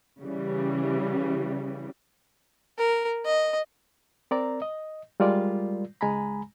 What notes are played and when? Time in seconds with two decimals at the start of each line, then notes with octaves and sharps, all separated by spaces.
0.19 C#3 E3 G3
2.78 A#4
3.25 D#5
4.31 C4 A#4 D5 A#5
4.62 D#5
5.20 G3 G#3 F4 A#4 D5
6.01 C#2 G#3 G#5 A#5 B5